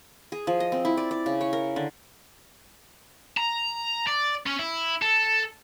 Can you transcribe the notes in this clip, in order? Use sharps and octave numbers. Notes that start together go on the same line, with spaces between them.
G#4
F3
D#5
C4
E4
D5
D5
C#3
C#5
A#4
D3
A#5
D5
C#4
E4
A4